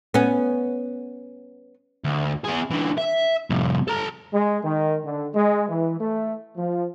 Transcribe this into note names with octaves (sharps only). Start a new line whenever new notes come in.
B3 C#4
D2
B3 G#4
D3 E3
E5
C2 F2
A4 A#5
G#3
D#3
D3
G#3
E3
A3
F3